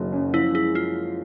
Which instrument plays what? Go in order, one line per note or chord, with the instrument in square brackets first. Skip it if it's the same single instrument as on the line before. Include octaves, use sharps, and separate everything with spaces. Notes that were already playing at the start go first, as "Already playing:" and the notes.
Already playing: [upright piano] F#1 D#3 F#3
F#2
[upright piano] F3 [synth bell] E4
[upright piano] G#3 [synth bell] E4
[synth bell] F4